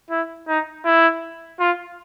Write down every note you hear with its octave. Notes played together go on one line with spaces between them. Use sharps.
E4
D#4
E4
F4